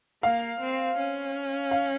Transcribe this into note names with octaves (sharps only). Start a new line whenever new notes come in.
A#3 F5
C4
C#4
F5